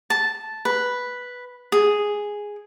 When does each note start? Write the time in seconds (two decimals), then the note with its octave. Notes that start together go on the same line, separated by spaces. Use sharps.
0.10 A5
0.65 B4
1.72 G#4